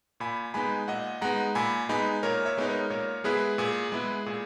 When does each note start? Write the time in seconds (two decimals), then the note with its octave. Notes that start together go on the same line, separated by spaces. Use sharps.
0.20 A#2 G#5 B5
0.54 G#3 B3 D#4 G#5 B5
0.88 A#2 D#5 F#5
1.21 G#3 B3 D#4 F#5 A#5
1.55 A#2 G#5 B5
1.89 G#3 B3 D#4 G#5 B5
2.23 A#2 A#4 C#5
2.45 C#5 E5
2.58 G#3 B3 D#4
2.68 A#4 C#5
2.90 A#2 A#4 C#5
3.24 G#3 B3 E4 G#4 B4
3.58 A#2 G#4
3.92 G#3 B3 E4
4.26 A#2 G#4